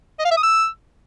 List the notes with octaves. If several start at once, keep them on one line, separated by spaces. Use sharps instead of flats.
D#5
F5
E5
D#6
E6